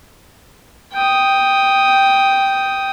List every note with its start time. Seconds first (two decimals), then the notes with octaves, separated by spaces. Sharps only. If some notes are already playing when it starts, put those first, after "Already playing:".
0.94 G5 D#6